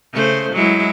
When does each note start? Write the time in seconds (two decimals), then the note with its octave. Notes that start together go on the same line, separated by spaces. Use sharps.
0.13 C#3 A3 C5
0.53 F#3 G#3 E4